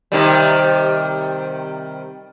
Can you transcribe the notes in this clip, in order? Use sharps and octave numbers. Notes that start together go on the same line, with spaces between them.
C3 D#3 G3